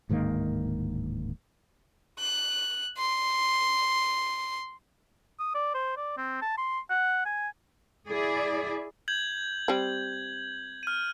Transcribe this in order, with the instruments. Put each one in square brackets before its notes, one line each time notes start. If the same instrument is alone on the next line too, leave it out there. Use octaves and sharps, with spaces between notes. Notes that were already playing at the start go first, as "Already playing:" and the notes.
[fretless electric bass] D1 G#2 D#3 A#3
[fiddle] F#6
C6
[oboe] D#6
D5
C5
D5
C4
A5
C6
F#5
G#5
[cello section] E4 G#4 D5
[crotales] G6 G#6 F#7
[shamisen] G3 C4
[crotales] F6 D#7